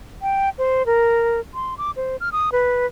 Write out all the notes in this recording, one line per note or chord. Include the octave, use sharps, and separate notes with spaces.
G5
C5
A#4
C6
D6
C5
F6
D#6
B4